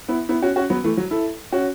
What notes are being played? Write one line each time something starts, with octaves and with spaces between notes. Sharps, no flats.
B3 E4
B3 E4
C#4 F#4
C#4 F#4
F#3 B3
E3 A3
F#3
E4 A4
C#4 F#4